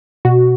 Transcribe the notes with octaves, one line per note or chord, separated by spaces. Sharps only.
B2 F#4